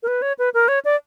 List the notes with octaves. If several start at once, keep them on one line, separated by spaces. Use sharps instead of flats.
A#4
B4
C#5
B4
A#4
C#5
D5